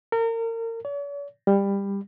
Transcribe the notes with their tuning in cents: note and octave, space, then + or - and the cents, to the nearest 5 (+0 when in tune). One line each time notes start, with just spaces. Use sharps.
A#4 -35
C#5 +45
G3 +20